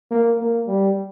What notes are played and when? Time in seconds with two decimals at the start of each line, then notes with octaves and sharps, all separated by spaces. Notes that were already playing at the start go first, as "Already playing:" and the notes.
0.11 A#3
0.39 A#3
0.67 G3